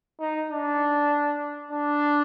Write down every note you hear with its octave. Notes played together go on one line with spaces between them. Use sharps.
D#4
D4
D4